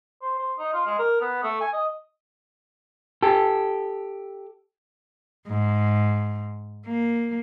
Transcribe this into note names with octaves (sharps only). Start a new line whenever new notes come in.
C5
C5
D#4
F4
G#3
A#4
B3
A3
G#5
D#5
G4 A4
G#2
A#3